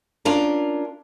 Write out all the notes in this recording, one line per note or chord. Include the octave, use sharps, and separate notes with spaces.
C#4 D4 F4 A#4